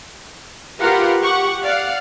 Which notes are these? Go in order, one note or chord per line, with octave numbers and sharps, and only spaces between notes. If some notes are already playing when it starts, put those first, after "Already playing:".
F4 G4 A#4 B4 F5 F#5
G4 F#5 C#6
D5 F5 F#5